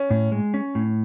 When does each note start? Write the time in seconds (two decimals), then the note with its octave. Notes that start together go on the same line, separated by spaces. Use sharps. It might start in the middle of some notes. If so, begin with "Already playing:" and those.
Already playing: C#4
0.11 A2
0.32 G#3
0.54 C#4
0.75 A2